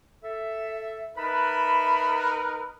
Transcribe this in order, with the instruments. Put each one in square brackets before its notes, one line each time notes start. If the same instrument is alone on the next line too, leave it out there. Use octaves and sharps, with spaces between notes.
[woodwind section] A4 E5
[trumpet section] D#4 A#4 B4 [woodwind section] E5 A5 B5